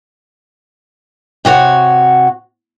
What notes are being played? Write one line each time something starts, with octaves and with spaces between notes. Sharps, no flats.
C3 F#4 C#5 F#5